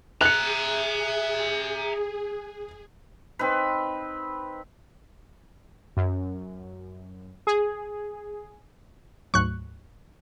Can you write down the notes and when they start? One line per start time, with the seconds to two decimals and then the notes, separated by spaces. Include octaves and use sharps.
0.21 G#4 E5 A#5 F#6 C#7
3.39 C4 D#4 B4
5.97 F#2
7.47 G#4
9.34 D2 G#2 F#3 C#6 F#6